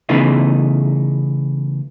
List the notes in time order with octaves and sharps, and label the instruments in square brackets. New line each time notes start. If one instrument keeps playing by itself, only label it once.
[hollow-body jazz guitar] C#3 E3 A3 B3 D#4 F4